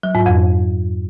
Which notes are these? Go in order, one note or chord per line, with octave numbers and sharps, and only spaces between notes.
F#3
G#2
F2